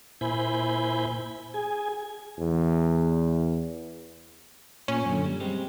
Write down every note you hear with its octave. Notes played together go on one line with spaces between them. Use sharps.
A#2 E4 C5 G#5 B5 G6
G#4 G#5
E2
A#2 C#4
F#2 D3
G3
G3 G#3 C4